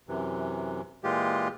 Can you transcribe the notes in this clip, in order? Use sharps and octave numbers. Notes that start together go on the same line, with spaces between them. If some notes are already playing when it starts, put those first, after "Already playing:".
F#2 C3 E3
A#2 E3 G#3 F4 G4